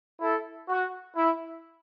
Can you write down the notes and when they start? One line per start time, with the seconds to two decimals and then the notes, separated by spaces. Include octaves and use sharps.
0.20 E4 A4
0.68 F#4
1.16 E4